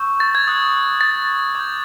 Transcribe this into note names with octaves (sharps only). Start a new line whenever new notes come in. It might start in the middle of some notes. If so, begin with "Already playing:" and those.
Already playing: C#6 E6 G6
A6
G#6
D#6 F#6 G#6
A6
D6 G6 G#6